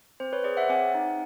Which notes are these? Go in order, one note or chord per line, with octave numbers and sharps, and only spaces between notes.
C4 C5
B4 C#5
G#4 C5 D5
E5 F#5
C4 F#5 G#5
D#4